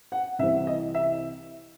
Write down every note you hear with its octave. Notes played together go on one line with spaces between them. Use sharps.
F#5
C2 C3 E3 C4 E5
D#5
E5